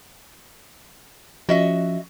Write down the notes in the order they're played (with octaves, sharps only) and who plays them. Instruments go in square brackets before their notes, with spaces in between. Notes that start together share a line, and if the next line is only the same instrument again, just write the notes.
[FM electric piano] F3 C#4 [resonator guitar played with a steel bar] F#4 D#5 E5